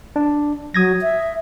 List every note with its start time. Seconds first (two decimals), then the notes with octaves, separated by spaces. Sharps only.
0.16 D4
0.74 F#3 D#6 G#6 A#6
1.02 E5